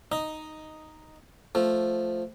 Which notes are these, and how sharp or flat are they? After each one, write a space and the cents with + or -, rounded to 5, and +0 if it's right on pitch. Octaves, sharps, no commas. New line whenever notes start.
D#4 +0 D#5 +0
F3 +0 A3 +0